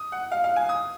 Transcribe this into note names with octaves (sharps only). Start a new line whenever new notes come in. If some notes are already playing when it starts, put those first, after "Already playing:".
Already playing: D#6
F#5
F5
F5
G#5
D#6